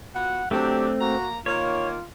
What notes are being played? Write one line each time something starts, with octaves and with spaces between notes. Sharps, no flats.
B3 F4 F#4 F#5
F#3 A3 C4 D4 G4
A#3 F#4 A#5
D#3 A#3 F4 C#5